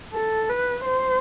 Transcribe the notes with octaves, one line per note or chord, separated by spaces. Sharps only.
A4
B4
C5